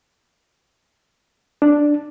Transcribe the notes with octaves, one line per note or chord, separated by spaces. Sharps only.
D4